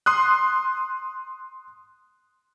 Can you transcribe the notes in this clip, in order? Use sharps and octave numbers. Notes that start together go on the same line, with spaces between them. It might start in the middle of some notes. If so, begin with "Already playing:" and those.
C6 D#6 F#6